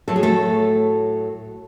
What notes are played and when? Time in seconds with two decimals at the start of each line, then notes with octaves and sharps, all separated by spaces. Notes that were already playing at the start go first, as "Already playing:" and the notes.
0.08 A2 F#3 A3 A4
0.16 G#4
0.23 A3 A4